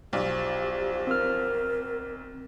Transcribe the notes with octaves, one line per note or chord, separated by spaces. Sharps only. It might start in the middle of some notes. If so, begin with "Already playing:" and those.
B1 F3 G4 D5
C4 A#4 F6